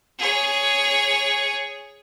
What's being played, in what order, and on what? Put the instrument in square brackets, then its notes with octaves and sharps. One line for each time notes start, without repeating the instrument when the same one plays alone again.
[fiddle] G#4 C#5